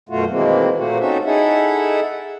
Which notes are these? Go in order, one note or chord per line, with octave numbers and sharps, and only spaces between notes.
F#2 B2 A3 F4 F#4
B2 D#3 E3 G#3 A#3 C4
A#2 A3 A#3 C4 F#4
C4 C#4 D#4 F#4 A4 E5
D#4 E4 G#4 A4 E5 F#5